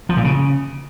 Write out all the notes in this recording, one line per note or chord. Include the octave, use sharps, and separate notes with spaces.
F3
A#2
C#3